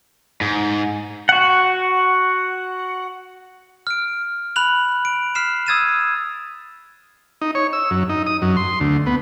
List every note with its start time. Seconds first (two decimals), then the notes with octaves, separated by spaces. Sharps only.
0.41 G#2
1.29 F#4 F#5
3.87 F6 D7
4.56 B5 F#6 F7 F#7
5.05 D7
5.35 F6 B6 C7 E7
5.66 D#6 E6 G#6 A6 D#7 E7
7.41 D#4
7.55 C#5
7.73 E6
7.91 F#2
8.09 D#4
8.27 D#6
8.42 F#2
8.57 C6
8.80 D2
9.06 B3